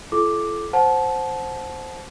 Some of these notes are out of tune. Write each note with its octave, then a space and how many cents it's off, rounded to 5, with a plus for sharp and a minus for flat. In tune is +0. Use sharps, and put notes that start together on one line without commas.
F4 -45 A4 -30 D6 +0
C5 +0 F#5 +0 A5 -25